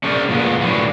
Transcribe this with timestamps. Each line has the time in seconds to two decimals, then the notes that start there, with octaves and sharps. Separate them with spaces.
0.03 C#4 D4 G#4 A#4 C5 D5
0.29 A#2 D#3 F3 G#3 B3
0.61 A2 D3 E3 F#3 G3 A#3